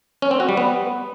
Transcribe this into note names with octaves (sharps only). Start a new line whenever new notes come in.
C#4
C4
F#4
G3
B3